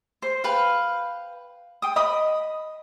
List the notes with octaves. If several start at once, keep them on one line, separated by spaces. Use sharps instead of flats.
C5
B4 F5 G5
G5 D#6
D#5 B5 D#6